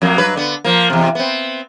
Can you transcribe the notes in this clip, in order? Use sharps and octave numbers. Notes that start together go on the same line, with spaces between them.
F2 F#3 A#3
G2 F#3 B4
D3 B3
F3 A#3
E2 C3
B3 C4